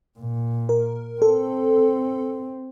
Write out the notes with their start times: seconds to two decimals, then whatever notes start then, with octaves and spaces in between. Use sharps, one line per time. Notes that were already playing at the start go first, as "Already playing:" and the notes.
0.19 A#2
0.69 A#4
1.22 C4 A4